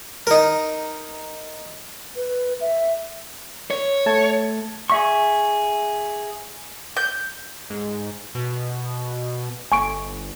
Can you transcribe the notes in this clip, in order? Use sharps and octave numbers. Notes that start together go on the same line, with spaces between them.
D#4 A#4
B4
E5
C#5
A3 A5 G#6
G#4 E5 C#6
G6
G#2
B2
G1 G#5 C#6 D7